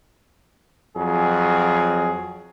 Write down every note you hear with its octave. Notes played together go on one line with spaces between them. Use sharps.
F2 F#3 G#4